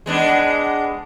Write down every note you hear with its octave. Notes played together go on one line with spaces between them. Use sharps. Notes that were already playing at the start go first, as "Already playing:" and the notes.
G#3 B3 D4